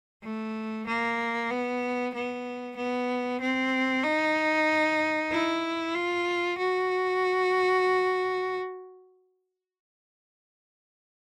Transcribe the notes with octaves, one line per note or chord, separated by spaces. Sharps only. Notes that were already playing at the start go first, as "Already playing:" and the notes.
A3
A#3
B3
B3
B3
C4
D#4
E4
F4
F#4